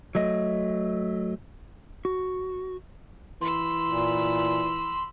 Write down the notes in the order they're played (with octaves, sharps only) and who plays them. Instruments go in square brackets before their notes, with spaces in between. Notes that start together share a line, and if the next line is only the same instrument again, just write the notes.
[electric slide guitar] F#3 A3 D#5
F#4
[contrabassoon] E3 [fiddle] B5 E6 [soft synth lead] C6
[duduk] A#2